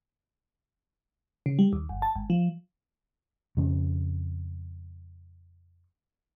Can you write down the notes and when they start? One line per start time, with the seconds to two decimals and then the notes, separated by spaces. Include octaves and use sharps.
1.46 C#3
1.59 G3
1.73 D#2
1.89 G1
2.02 A5
2.16 G#1
2.30 F3
3.57 F2 C#3